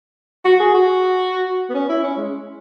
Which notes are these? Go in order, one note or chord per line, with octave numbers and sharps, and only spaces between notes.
F#4
G#4
F#4
B3
C#4
E4
C#4
G#3